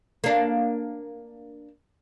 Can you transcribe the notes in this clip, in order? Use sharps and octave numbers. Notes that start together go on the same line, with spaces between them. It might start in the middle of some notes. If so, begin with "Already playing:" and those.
A#3 D4